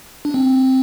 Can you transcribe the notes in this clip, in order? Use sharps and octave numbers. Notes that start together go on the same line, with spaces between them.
D4
C4